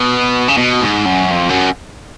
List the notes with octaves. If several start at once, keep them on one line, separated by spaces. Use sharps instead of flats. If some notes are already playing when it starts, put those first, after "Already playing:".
Already playing: B2
C#3
B2
G#2
F#2
F2
F#2